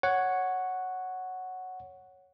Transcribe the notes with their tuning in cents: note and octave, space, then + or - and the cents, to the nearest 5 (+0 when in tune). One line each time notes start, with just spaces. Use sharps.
C#5 +0 F#5 +0